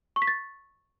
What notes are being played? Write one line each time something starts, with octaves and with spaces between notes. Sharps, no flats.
C#6
B6
A6